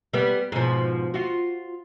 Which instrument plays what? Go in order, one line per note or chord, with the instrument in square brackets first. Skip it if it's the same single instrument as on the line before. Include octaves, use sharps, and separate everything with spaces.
[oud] G3 B3
G#2 B2 F3
F4 F#4